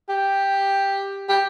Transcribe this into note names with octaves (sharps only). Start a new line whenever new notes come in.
G4
G4